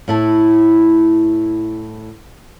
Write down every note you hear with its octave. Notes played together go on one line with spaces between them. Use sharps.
A2 E4 A5